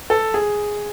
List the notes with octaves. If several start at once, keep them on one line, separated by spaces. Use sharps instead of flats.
A4
G#4